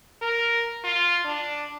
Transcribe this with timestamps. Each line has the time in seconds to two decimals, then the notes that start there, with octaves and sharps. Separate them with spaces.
0.22 A#4
0.84 F4
1.25 D4